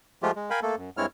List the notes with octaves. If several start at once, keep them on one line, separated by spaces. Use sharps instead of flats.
F3 G#3 A3 F4 G4
G#3
A#4 F5 G5 G#5 B5
A3 A#3 A4
F#2
G2 G#3 C4 E4 C#5 F6